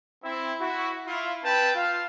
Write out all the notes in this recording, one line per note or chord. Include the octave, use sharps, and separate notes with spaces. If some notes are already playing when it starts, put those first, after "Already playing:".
C4 E4
E4 F#4
E4 F4 F5
C4 B4 G5 A5
F4 F5